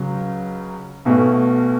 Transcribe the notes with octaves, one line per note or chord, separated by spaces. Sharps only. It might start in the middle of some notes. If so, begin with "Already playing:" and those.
Already playing: C#2 C#3 F#3
B1 B2 A3